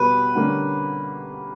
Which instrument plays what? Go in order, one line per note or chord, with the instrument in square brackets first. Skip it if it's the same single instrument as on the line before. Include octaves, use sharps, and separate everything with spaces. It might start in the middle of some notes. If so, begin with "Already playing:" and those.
Already playing: [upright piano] B2 G3 B3 G4 [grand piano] B4
[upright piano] D3 G3 A#3 C#4